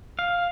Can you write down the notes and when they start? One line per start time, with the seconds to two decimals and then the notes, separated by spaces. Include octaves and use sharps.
0.19 F5